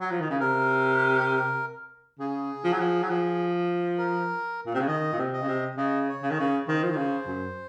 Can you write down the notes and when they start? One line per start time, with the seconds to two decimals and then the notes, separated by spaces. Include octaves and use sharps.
0.01 F#3
0.11 F3
0.20 D#3
0.30 C#3
0.40 C3 A#4
2.19 C#3 G#4
2.64 F3
2.72 F#3
2.80 F3
3.03 F#3
3.09 F3
3.98 A#4
4.66 A#2
4.74 C3
4.80 C#3
4.88 D#3 D#5
5.12 A#2
5.18 C3
5.33 D#5
5.41 C#3
5.48 C3
5.77 C#3 D#5
6.08 C#5
6.22 C#3
6.31 D#3
6.37 C#3 C#5
6.67 D#3 C5
6.83 F3
6.91 D#3
6.97 C#3
7.27 F#2